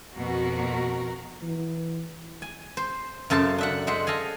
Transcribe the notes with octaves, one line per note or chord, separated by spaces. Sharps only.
F2 B2 F#4 A#4
E3
G#5
C5
F#2 C#3 A4 C5 A5
D4 E5 F#5
G#3 C5 E5 F#5
A4 D#5 F5 G#5